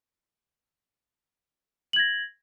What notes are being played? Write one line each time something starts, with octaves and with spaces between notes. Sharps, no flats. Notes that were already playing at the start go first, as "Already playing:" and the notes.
G#6 A#6 F#7